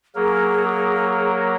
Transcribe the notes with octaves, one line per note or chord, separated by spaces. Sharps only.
F#3 A#3 G#4 A#4